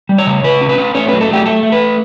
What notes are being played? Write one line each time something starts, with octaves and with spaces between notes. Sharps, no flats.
G3
C#5
C#3
C#3 B4
C#4
B4
C#4
A3 C#5
F#3 B4
A4
A3 G4
A3 A4
A3
B4